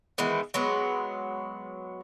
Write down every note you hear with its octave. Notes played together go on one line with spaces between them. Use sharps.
D#3 E3 G#3 B3
F#3 G#3 B3